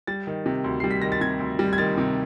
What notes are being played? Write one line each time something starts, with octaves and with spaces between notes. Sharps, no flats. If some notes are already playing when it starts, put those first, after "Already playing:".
G3 A6
D#3
C3
D2
G3 C7
B6
D#3 A#6
A6
C3 G#6
D2
G3
G#6
D#3 A6
C3